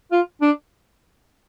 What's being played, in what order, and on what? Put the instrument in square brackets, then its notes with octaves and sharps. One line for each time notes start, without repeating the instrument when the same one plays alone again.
[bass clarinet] F4
D4